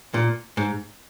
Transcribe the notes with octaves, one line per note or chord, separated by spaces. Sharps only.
A#2
G#2